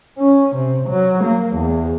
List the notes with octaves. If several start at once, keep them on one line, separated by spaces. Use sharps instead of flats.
C#4
C3
F#3
A#3
E2